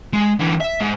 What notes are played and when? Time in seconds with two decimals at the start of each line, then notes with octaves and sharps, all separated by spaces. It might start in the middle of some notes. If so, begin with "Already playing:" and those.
0.13 G#3
0.40 D3 E3
0.61 E5
0.81 G#2